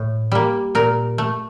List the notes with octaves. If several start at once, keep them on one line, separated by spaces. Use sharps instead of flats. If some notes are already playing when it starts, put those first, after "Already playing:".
Already playing: A2
G3 A#3
A#2 A#4
A3